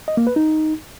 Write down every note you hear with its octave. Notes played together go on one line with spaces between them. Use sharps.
D#5
A#3
B4
D#4